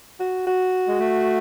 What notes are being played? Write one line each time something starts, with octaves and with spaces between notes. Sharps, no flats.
F#4
F#4
G#3
A3